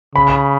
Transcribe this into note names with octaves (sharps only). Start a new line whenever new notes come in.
C#3 B5